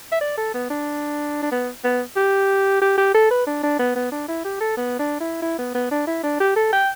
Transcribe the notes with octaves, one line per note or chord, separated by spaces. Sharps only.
E5
D5
A4
B3
D4
D4
B3
B3
G4
G4
G4
A4
B4
D4
D4
B3
B3
D4
E4
G4
A4
B3
D4
E4
E4
B3
B3
D4
E4
D4
G4
A4
G5